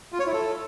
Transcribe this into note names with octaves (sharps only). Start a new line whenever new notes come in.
F4
C#5
E4
A4